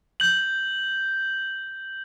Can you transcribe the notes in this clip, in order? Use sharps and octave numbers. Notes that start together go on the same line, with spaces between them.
G6 F#7